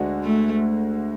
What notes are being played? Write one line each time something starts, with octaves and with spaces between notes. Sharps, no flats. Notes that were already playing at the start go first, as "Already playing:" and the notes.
Already playing: D2 D3 G#3 D4 F#4
A3